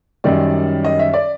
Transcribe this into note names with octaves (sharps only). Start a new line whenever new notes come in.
F#2 D#3 G3 D5
D#5
E5
D5